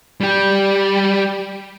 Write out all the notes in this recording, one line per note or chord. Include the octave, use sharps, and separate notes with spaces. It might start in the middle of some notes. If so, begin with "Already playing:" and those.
G3 G4